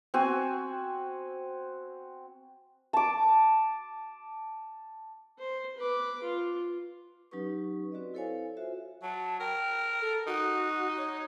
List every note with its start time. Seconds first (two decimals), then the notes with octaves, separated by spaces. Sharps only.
0.14 C4 F#4 G#5
2.93 A5 D6
5.38 C5
5.77 B4 D6
6.23 F4
7.31 F#3 C#4 D#4 G4 B4 C#6
7.92 C4 F#4 B4 D5 D#5
8.14 E4 A4 C5 C#5 F5 G#5
8.57 F4 F#4 C5 E5
9.02 F#3 A5
9.40 A#4 G5
10.01 A4
10.27 D#4 F#4
10.97 C#5